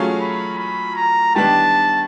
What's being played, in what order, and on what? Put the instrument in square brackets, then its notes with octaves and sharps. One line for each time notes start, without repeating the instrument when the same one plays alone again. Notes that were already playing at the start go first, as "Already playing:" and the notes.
Already playing: [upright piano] F#3 A3 C#4 F4 G#4
[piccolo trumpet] B5
B5
A#5
[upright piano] D#3 G3 B3 D4 [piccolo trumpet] A5